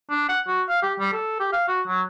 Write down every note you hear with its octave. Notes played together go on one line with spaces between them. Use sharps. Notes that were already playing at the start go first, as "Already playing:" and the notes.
D4
F#5
F#4
F5
G4
G3
A4
G4
F5
F#4
F#3